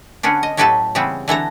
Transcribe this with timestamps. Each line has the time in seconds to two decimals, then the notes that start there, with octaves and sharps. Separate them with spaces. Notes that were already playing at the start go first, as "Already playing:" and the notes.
0.23 D3 B3 C#4 D4
0.43 D#5
0.57 A2 F#3 G4 A4 B4 A5
0.95 C#3 E3 G3 B3 C4
1.28 D3 E3 A4 A#5